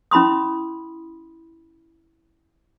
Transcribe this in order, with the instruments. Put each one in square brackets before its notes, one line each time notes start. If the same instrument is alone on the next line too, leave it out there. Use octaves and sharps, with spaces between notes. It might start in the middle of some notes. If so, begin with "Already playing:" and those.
[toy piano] C#4 E4 B5 C6 D#6